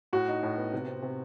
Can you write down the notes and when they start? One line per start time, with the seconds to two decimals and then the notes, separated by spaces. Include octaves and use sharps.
0.13 A2 F#4
0.28 D#4
0.43 A2
0.57 B3
0.73 C3
0.88 C4
1.02 C3